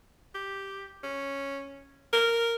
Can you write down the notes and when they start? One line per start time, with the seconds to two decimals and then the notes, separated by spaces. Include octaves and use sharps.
0.35 G4
1.03 C#4
2.13 A#4